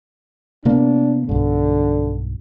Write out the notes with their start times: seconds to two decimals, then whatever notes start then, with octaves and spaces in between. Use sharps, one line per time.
0.65 C3 A#3 B3 D4
1.29 B1 G2 D3